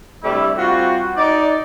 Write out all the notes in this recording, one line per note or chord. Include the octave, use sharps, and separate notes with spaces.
G2 C3 G3 A3 E4 E5
G3 C4 F4 F#4
D#4 D5